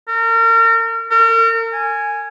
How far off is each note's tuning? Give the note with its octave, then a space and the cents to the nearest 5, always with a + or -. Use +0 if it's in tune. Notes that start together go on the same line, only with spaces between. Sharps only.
A#4 -35
A#4 -40
G#5 +0